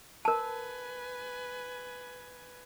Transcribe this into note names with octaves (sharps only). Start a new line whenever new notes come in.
A#4 B4 G#5 A5